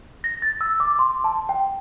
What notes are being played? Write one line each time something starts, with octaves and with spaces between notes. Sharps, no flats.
A#6
A6
E6
D6
C6
A5
G5